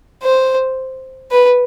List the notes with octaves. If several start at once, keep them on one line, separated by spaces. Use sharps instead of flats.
C5
B4